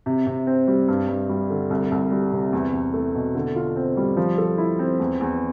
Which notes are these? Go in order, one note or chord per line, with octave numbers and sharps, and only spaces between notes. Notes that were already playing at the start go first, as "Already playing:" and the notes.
C3
C3
C4
G3
G2
G2
G3
D3
C2
C2
G3
C3
E2
E2
A3
B2
D3
F4
C4
G3
F3
A4
E4
C4
E2
E2